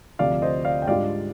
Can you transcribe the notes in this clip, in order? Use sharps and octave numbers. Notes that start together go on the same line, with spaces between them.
D2 C3 F3 D5 F5
C5 D#5
D5 F5
G5
G#2 G3 D4 F4 D5 F5